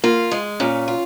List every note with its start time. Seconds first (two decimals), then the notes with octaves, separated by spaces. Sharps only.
0.04 A#3 F4
0.31 G#3
0.60 A#2 C#4
0.88 F4